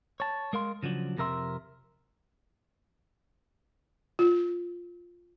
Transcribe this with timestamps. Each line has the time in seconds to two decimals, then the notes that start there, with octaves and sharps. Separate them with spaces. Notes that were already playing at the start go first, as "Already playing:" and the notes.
0.20 C#5 A5
0.53 G#3 A#4 F5 C6
0.83 C#3 F3 F#3 D4
1.17 F2 C3 A#4 E5 C6
4.19 F4